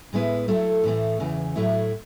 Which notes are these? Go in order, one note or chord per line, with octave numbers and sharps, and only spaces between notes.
A2 G#3 B3 E4 B4
F#3 A3 E4 A4
A2 E3 A3
E2 C#3 E3
A2 F#3 A3 E4